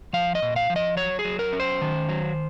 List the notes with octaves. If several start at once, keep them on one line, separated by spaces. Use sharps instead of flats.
F3 F5
D#5
A#2
F5
F3
D#5
F#3 C#5
G#4
F#3
A#4
C#4
C5
D#3
F#3